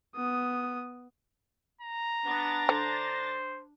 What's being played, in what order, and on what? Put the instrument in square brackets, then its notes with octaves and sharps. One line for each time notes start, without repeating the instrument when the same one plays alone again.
[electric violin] B3 D#6
[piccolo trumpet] A#5
[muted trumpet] B3 [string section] D4 A6 A#6
[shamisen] D3 [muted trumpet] C5